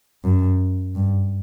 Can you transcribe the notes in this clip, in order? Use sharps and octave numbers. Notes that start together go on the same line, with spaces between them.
F#2
G2